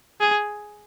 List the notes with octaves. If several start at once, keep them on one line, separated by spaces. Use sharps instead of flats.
G#4